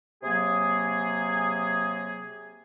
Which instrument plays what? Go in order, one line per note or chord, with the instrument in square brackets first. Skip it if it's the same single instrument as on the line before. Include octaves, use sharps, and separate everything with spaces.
[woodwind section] C3 F#3 A#3 G#4